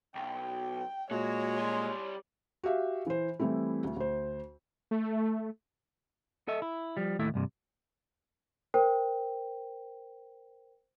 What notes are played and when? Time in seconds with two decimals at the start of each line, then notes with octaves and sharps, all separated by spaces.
0.15 B1 G5
1.11 A#2 G#3 F#4 C#5
1.58 G3 C6
2.63 F#4 G4 E5 F5
3.07 E3 C5
3.39 E3 G3 A3 C4 E4
3.84 D2
3.97 D2 C5
4.91 A3
6.48 A4 D#5 E5
6.62 E4
6.97 F3 G3
7.19 D#2 A2 A3 E4 E5
7.34 C2 G2 C3
8.74 A#4 C5 G5